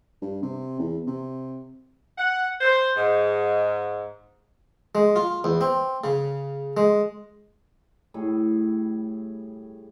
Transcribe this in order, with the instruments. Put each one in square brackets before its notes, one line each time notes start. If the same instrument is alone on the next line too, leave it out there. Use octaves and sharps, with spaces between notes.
[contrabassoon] G2
C3
E2
C3
[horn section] F#5
C5
G#2
[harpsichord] G#3
F4
E2
C4
C#3
G#3
[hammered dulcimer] A2 G3 G#4